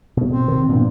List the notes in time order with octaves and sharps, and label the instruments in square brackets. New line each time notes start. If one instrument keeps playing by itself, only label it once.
[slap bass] B2
[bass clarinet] C4
[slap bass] C3 D#3
[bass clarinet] G2 [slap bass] A#2 F3 B3